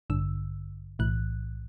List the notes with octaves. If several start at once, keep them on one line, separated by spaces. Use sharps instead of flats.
A1 G2 D3 E6
B1 A2 E3 F#6